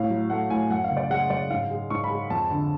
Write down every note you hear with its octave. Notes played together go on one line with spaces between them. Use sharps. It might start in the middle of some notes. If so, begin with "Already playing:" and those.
Already playing: A2 F5
F#3
A3 F#5
A2 G#5
F#2 F#5
F5
C#3
D5
G#3 F#5
F#2 D5
G#2 F5
G#3
G#2 C#6
B5
G#3
F2 A5
D3